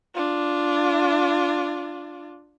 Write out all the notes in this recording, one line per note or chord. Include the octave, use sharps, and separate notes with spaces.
D4 F4